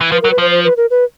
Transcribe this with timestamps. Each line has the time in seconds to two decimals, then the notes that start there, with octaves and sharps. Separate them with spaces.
0.01 E3
0.12 F3 B4
0.22 A#4
0.25 F#3
0.31 B4
0.38 F3 C5
0.51 C5
0.64 B4
0.77 A#4
0.90 B4